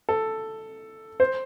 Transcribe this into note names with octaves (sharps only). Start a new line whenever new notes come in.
A4
C5